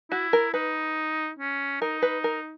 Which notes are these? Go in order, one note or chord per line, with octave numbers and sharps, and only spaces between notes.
E4 F#4
A#4
D#4 B4
C#4
D#4 A#4
B4
A#4